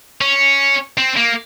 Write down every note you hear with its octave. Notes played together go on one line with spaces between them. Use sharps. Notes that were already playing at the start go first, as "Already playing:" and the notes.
C#4
C4
A#3